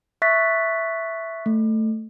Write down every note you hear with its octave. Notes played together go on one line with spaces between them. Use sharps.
E5 C#6 F#6 A6 B6
A3